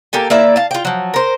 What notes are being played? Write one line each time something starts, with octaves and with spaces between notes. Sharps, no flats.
A#3 G4 A4 G#5
A#3 E4 D5 E5
F5 A5
F4 G5
F3 F#3
A#4 C5